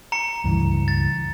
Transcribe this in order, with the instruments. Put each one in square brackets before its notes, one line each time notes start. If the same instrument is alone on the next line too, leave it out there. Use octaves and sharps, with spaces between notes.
[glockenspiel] A#5 C#7
[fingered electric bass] C#2 G2 E3
[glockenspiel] A6